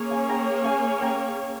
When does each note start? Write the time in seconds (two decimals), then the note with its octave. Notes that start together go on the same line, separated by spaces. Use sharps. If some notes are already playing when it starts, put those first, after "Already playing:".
Already playing: A#3 C#4 G#4 C#5 A#5
0.11 F5 G#5
0.29 G5 A#5
0.65 F5 G#5
1.01 G5 A#5